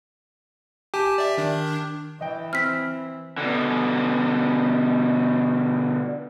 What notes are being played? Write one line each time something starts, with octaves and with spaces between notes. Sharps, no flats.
G4 G#5 A5
D5 E5
D#3 D4
E3 D#5 G5
C4 F6 B6
B2 D3